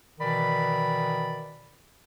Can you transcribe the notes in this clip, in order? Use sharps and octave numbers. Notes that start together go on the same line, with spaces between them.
B2 D#3 E3 D5 B5